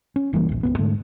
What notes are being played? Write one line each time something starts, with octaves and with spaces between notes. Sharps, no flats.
C#4
F#1 E3 G3 A#3
D#1 A#1
D1 D#2 B3
G#2 D3 G#3 A3